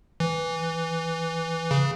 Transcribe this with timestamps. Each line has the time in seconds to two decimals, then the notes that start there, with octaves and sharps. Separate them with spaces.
0.20 E3
1.71 C#3